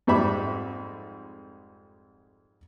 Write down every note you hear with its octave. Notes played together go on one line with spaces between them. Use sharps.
F2 G#2 G3 E5 B5 D6